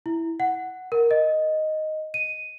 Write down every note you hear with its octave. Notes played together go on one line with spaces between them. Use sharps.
E4
F#5
A#4
D#5
D#7